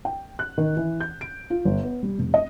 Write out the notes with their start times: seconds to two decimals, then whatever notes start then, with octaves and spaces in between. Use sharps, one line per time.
0.05 G5
0.39 F#6
0.58 D#3
0.77 E3
1.00 G6
1.21 D7
1.50 F4
1.65 G1
1.83 B3
2.03 G3
2.19 F1
2.34 D#5